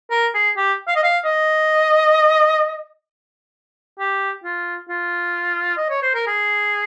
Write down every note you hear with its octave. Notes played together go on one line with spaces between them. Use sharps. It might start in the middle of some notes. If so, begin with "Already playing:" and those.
A#4
G#4
G4
F5
D#5
F5
D#5
G4
F4
F4
D#5
C#5
C5
A#4
G#4